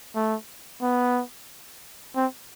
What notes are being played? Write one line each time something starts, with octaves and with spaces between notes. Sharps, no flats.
A3
B3
C4